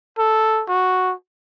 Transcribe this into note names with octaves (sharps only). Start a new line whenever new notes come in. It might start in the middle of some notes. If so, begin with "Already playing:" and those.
A4
F#4